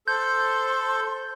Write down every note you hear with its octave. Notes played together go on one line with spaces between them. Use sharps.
A4 C5 C6 G6